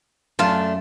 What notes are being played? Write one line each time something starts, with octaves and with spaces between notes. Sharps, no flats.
F#2 A3 D4 F4 A5